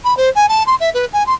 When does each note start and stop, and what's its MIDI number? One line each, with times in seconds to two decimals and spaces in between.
0.04 0.16 83
0.17 0.30 72
0.35 0.46 80
0.48 0.63 81
0.66 0.75 84
0.80 0.90 76
0.94 1.05 71
1.13 1.26 80
1.26 1.33 84